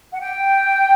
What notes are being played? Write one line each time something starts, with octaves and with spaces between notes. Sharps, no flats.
F#5
G5